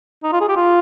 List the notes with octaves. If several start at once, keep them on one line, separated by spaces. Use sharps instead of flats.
D#4
F4
G#4
G4
F4